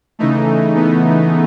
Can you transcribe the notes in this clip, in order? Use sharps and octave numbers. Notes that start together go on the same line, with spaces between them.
C#3 E3 A3 D#4
B3